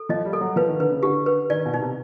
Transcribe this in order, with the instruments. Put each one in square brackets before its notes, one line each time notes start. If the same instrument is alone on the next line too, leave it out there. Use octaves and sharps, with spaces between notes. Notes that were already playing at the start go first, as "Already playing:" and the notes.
Already playing: [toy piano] A4
[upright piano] F3 [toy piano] D#5
[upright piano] G3
[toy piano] A4
[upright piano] F#3
[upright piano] F3 [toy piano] B4
[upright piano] D#3
[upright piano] D3 [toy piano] B4
[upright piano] C#3
[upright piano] D3 [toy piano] G4
[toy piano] B4
[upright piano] D#3 [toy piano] D5
[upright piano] B2
[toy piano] D#4
[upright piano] C3